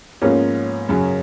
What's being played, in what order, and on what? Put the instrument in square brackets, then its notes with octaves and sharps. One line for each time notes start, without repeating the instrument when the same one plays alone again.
[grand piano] G#2 F3 B3 F4 [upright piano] A#3 C#4
[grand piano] F#2 C#3 F#3